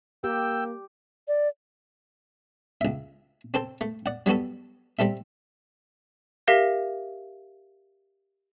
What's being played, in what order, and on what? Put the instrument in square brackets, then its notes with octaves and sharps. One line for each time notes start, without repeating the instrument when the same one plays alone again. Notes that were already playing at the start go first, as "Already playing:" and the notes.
[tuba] A#3 [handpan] G4 [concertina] G5 E6
[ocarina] D5
[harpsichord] C#2 E5
C4 A4 C5 A5
A3
D5 F#5
F#3 G3 B3 F#4 A4
G3 C4 A4 E5
[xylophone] G4 A#4 E5 F5 A#6 B6